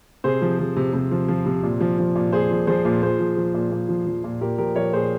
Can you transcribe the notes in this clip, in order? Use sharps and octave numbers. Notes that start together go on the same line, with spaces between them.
C3 G#4 C5
F3
F3
C3
C3
F3
F3
C3
A#2
F3
F3
A#2
A#2 G#4 C5
F3
F3 G#4 C5
A#2
A#2 G#4 C5
F3
F3
A#2
A#2
F3
F3
A#2
A#2 G4 A#4
F3 G4 A#4
F3 A#4 C#5
A#2 G#4 C5